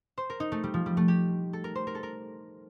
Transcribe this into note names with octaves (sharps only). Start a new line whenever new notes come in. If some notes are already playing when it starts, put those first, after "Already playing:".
C5
A#4
D#4
A3
G3
F3
G3
A3
G4
A4
A#4
C5
A#4
A4
A#4